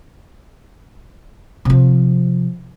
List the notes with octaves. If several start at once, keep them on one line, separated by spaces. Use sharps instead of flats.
C3 F3